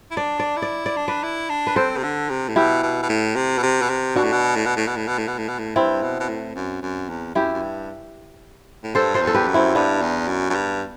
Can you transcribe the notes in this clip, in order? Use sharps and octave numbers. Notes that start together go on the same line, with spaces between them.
E4
D4 D5
D5
E4
D5
D5
D4
B4 D5
E4
D4
B4
C4 A4 C5
C3
D3
C3
A2
B2 E4 G4
B2
B2
A2
C3
B2
C3
B2
C3
B2 D4 F#4
A2
B2
A2
B2
A2
B2
A2
B2
A2
B2
A2
B2
A2
G2 C4 E4
B2
B2
A2
F#2
F#2
E2
F#2 E4 G4
F#2
G2
A2
G2 A4 C5
A4 C5
E2
A4
G4 B4
F#2
C4 E4
G2 B3 D4
E2
F#2
F#2
G2